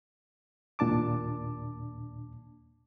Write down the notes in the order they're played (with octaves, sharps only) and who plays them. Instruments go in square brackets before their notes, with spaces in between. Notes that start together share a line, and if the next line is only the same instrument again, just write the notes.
[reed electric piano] D#2 A#2 D4 A5 D6